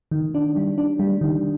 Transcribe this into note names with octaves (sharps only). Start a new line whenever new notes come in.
D#3
D4
G3
D4
G3
D#3